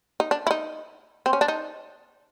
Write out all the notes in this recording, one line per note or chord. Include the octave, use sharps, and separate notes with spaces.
D#4
D4
E4
D#4
C4
C#4
D4
D#4